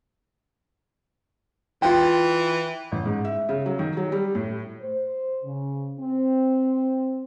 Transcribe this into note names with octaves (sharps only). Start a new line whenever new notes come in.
E3 F4 G5
A1
G#2
E5
C#3
F#3
D#3
F#3
G3
A2
C5
C#3
C4